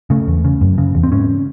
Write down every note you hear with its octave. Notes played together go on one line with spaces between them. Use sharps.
C#3 A3
E2
C#3
F#2
C#3
E2
C4
G#2 C#4